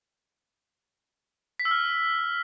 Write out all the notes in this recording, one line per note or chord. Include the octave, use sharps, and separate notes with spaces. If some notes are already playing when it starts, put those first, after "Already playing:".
B6
E6
F6